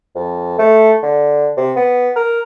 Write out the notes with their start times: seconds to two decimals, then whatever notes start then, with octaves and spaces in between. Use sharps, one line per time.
0.15 F2
0.58 A3
1.03 D3
1.57 C3
1.76 B3
2.16 A#4